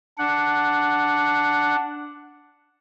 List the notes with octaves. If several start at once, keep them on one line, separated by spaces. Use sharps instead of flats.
D4 F#5